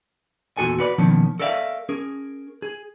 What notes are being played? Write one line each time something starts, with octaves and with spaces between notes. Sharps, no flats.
E2 A#2 F#4 A4 G#5
F#4 B4 D5
B2 D#3 F3 A#3 C#4
A4 A#4 D5 E5 F5
C#4 G#4 A#4
G#4